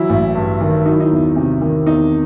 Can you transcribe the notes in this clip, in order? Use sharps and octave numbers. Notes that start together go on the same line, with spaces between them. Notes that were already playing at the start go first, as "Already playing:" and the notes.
Already playing: E3 F#3 E4
A1
G2
D#3
F#3 D#4
E4
D#4
E2
C3
D#3
E2 D#4